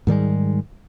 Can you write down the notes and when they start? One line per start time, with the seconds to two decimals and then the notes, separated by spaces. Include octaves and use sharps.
0.07 G#2 D#3 G3 G#3